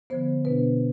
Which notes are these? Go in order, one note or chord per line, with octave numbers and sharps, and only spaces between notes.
D3 F3 B3 C5
B2 B3 D4 B4